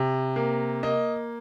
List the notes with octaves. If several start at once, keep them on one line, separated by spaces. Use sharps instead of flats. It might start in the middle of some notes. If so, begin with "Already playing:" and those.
Already playing: C3
A#3
A#3 D#5